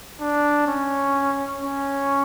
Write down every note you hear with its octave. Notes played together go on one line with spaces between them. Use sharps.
D4
C#4
C#4